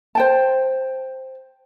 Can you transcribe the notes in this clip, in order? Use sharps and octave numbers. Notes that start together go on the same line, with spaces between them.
C5 G5 A5